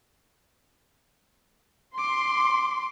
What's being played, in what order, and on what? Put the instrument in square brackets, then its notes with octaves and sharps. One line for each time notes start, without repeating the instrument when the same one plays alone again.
[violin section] C6 [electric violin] D6